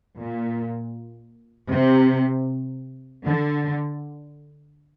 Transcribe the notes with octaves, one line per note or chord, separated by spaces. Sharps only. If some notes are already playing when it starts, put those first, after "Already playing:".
A#2
C3
D3